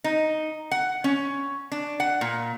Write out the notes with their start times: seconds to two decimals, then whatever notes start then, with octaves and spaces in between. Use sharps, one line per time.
0.04 D#4
0.71 F#5
1.04 C#4
1.72 D4
2.00 F#5
2.21 A#2